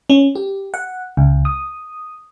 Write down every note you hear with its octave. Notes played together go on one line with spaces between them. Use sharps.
C#4
G4
F#5
C#2
D#6